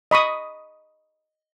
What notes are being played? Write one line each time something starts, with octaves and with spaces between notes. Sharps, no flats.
D#5 B5 C#6 D#6